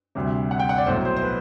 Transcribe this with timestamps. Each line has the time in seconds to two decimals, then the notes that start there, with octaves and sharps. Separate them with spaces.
0.15 D2 C3 G3
0.51 F#5
0.60 G5
0.69 F#5
0.78 D5
0.86 B1 A2 F#3 C5
1.05 C5
1.17 C5
1.23 B4